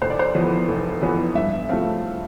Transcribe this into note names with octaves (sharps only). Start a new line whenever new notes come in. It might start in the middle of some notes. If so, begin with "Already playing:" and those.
F1 C5
D5
C5
F2 E3 B3
F1
F2 E3 B3
G2 E5
F3 A3 C4 F5